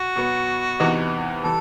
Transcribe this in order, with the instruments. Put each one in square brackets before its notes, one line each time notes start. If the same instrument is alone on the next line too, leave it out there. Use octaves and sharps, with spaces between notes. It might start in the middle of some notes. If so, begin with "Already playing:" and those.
Already playing: [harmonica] F#4
[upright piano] B2 F#3 B3
E2 C3 E3 B3 D#4
[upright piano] E3 G3 [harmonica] A4